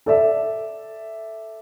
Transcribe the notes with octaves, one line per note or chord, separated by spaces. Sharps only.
A4 D5 E5